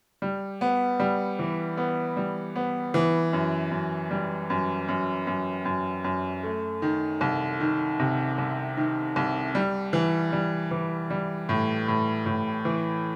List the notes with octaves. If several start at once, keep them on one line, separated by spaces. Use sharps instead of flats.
G3
B3
G3
E3
B3
G3
B3
E3
F#2
F#2
G3
F#2
F#2
F#2
F#2
F#2
A3
D#3
C2
D#3
C3
C2
D#3
C2
G3
E3
G3
E3
G3
A2
A2
A2
E3